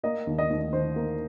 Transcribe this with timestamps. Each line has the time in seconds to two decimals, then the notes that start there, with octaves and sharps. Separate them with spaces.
0.03 A#3 D#5
0.27 D#2
0.38 D#5
0.50 D#2
0.73 D#3 C5
0.96 A#3